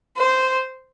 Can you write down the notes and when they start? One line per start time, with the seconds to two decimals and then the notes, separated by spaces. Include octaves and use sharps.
0.17 C5